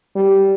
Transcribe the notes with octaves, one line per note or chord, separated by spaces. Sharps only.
G3